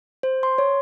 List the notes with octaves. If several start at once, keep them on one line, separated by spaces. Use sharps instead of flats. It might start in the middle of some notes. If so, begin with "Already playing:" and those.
C5
C6
C#5